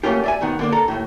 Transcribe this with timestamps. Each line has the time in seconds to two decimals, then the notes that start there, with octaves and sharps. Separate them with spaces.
0.04 F#3 A3 A#3 C#4 F4 G4
0.24 D5 E5 G#5
0.41 B1 D#3 B3
0.59 D3 A#3 D4
0.72 A4 A#5
0.88 D#2 A2